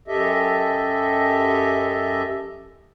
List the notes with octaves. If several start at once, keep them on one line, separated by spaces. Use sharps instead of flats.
F#2 G4 A4 D#5 E5